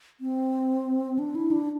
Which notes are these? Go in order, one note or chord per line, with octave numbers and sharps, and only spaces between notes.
C4
D4
E4
D4